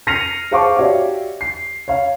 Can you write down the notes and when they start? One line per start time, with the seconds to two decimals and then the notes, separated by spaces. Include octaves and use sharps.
0.07 F6 A#6 C7 C#7 D#7 F7
0.51 G#4 C5 F5 A5 C#6 D6
0.77 F#4 G4 C#5 D5 E5 F5
1.41 C7
1.88 C#5 F5